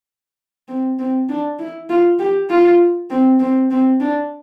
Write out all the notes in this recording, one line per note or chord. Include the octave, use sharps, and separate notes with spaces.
C4
C4
D4
E4
F4
G4
F4
C4
C4
C4
D4